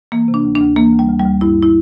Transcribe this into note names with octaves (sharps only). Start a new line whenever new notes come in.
E3 A#3
C3
D4
D2
D4
D2
E3 A#3
D2
G3
D2
G3
D2
G2 E4
E4